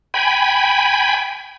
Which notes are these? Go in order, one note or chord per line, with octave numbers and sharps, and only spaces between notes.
G5 G#5 B5